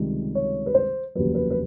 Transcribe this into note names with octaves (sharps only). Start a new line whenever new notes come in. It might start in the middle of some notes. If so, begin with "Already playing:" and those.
Already playing: C#2 C3 D#3 G3
C#5
B4
C5
F1 D#2 C#3 F#3 B4
B4
B4